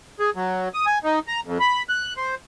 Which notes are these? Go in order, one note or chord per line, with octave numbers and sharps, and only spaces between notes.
G#4
F#3
D#6
G#5
D#4
A#5
F2
B5
F#6
C5